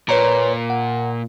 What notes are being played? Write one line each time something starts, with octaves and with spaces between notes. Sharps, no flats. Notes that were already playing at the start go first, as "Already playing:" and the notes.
A#2 B4 C#5 A#5
F#5